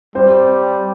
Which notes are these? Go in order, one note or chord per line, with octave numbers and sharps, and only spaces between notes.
G3 C4 C5